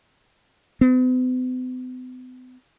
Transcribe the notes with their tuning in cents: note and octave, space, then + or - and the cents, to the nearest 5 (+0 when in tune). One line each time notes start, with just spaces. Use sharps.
B3 +45